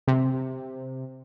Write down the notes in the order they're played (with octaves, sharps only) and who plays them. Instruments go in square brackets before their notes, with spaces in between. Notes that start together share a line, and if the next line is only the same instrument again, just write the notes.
[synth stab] C3